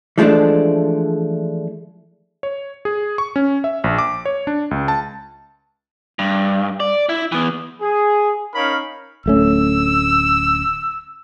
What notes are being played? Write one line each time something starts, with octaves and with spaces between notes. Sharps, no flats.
E3 F3 G#3 A3 D4
C#5
G#4
C#6
C#4
E5
A#1
D6
C#5
D4
C#2
A5
G2
D5
E4
E3 B3
G#4
C#4 D#4 A#4 C#5 F5 B5
D1 A3 C#4 E6